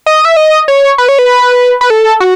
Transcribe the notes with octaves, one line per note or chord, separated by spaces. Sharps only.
D#5
E5
D#5
C#5
B4
C#5
B4
B4
A4
F#4